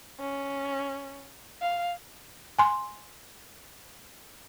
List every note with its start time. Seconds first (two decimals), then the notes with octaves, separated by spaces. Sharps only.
0.20 C#4
1.61 F5
2.59 G#5 C6